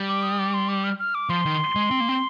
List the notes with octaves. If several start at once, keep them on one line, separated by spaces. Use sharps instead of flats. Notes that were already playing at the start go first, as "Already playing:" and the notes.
Already playing: G3
D6
D#6
D6
C6
D6
F6
F6
D6
F3 C6
D#3
G#3
C4
A#3
C4